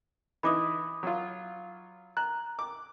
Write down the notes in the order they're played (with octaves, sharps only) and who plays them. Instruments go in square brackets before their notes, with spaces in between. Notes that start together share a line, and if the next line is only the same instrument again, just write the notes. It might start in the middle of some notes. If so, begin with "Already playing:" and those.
[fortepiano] E3 D#4 E4 [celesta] B5 D6 D#6
[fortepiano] F#3 F4
[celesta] A#5 [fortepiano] F#6
[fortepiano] D6